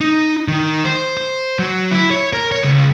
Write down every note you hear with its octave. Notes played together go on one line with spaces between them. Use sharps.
D#4
D#3
C5
C5
F#3
E4
C#5
A#4
C#5
C#2